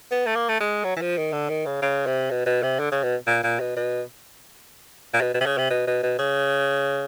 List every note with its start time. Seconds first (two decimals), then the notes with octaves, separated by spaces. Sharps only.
0.11 B3
0.26 A3
0.36 A#3
0.49 A3
0.60 G#3
0.84 F#3
0.96 E3
1.01 F3
1.18 D#3
1.33 D3
1.49 D#3
1.66 C#3
1.82 C#3
2.06 C3
2.31 B2
2.46 B2
2.63 C3
2.79 D3
2.92 C#3
3.03 B2
3.27 A#2
3.43 A#2
3.60 B2
3.76 B2
5.14 A#2
5.21 B2
5.34 B2
5.41 C3
5.46 C#3
5.58 C3
5.70 B2
5.87 B2
6.03 B2
6.19 C#3